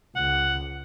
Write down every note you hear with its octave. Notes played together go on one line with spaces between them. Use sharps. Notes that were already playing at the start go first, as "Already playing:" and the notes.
C#2 F#5